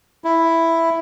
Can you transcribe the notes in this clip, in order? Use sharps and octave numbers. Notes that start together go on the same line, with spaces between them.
E4